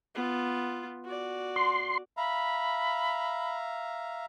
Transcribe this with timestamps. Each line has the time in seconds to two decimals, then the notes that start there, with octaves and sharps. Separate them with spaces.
0.15 B3 F4
1.04 F#4 D5
1.56 C6
2.17 E5 F5 A#5 B5